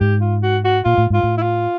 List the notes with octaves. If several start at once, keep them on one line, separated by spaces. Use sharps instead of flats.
G#2 G4
F4
F#4
F#4
A#2 F4
A2
G#2 F4
A2
E4
F4